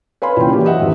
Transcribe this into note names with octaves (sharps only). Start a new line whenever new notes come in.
B4 C#5 F5 G#5 B5 C6
A#2 E3 C#4 G5
E3 F#3 A#3 G4
F#4 D#5 E5 F#5
D#1 E2